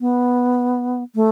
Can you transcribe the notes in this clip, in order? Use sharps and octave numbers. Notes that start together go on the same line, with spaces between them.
B3
A3